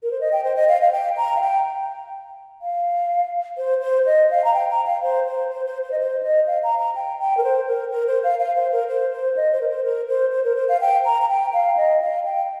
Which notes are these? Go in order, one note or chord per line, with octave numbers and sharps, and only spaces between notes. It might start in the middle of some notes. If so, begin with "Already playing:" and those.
A#4
C5
D#5
G5
C5
D#5
F5
F5
G5
A#5
F5
G5
F5
C5
C5
D#5
F5
A#5
G5
A#5
F5
C5
C5
C5
C5
C5
D#5
C5
D#5
F5
A#5
A#5
G5
G5
A#4
C5
A#4
A#4
C5
F5
F5
C5
A#4
C5
C5
D#5
C5
A#4
C5
A#4
C5
C5
A#4
C5
F5
G5
A#5
A#5
G5
F5
D#5
F5
G5